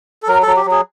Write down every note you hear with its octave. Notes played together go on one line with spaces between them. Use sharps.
A4
F#3 A#4
F#3 A4
G4
F#3
G#4